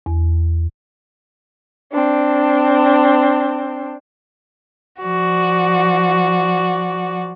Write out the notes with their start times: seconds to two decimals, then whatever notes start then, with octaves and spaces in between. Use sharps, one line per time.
0.06 E2
1.93 C4 D4
5.02 F3 F#4 D5